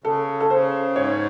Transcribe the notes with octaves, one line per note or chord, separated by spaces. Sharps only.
C#3 A4
A4
C#3 C5
G#2 C#5